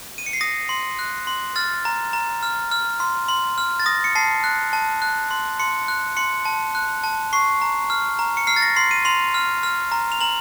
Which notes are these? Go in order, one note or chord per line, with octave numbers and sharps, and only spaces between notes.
D#7
C#7
C7
D#6 A#6
C6
F#6
C6
F6 A6
A#5
A#5
F6
F6
C6
C6
F6
A6
D#6 A#6
C#7
A5 C7
F#6
A5
F#6
C6
C6 C#7
F#6
C6 C#7
A5
F#6
A5
C#6 C7
A#5
F6
A#5
C#7
F6 C7
A6
A#6
C6 C7
D#7
C6 F7
F6
F6
A#5
F7
A#5 F#7